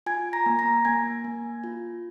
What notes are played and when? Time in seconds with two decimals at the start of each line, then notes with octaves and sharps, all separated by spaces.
0.06 F4 G#5 G#6
0.33 A#5 A#6
0.46 A#3
0.59 A#5 A#6
0.85 A#3 G#5 G#6
1.24 A#3
1.64 F4